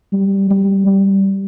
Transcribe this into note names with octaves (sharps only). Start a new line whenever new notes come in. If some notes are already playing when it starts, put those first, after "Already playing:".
G3
G3
G3